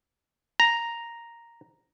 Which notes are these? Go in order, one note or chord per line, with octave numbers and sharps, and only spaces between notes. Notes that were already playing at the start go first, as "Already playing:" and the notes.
A#5